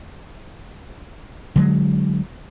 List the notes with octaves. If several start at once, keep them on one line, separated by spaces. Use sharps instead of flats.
D3 F#3 G#3